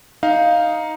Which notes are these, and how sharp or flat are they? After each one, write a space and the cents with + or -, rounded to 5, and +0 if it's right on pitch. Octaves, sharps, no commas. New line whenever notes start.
D#4 +5 F5 +0